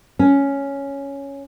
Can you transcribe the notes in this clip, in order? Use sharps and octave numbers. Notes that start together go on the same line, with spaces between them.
C#4